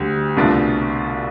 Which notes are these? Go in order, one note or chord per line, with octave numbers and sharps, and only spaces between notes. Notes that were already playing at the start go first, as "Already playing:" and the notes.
Already playing: D2 D3 G3
C2 B2 A3 D4 F4